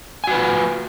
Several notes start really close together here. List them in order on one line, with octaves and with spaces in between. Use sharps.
G#5 F#4 B4 F4